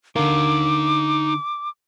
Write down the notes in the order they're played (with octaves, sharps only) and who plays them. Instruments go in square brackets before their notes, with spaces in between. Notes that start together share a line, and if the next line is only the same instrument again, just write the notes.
[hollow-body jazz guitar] D3 A#4 [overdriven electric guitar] D#4 F5 [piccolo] D6